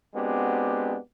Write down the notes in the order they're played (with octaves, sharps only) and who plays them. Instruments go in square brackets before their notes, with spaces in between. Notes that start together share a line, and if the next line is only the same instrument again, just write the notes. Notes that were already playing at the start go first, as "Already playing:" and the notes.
[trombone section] G#3 B3 C4 D4 F#4 G4